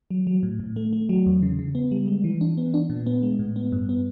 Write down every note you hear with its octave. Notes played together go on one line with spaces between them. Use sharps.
F#3
F#3
A2
A2
A3
A3
F#3
E2
C#3
C#3
B3
G3
G#3
E3
D4
B3
D4
A#2
B3
G#3
A2
B3
G2
B3